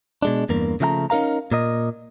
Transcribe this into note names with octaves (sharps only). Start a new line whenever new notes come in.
B2 G#3 D4
E2 G2 A#3
C#3 F3 A3 F5 A#5
C#4 D#4 A#4 F5 A#5
A#2 A#4 D#5